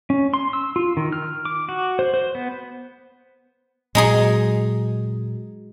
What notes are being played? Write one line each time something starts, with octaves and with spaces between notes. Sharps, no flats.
C#4
C6
E6
F4
D#3
F6
D6
F#4
C5
C5
B3
A#2 F#3 G#3 D#4 G#4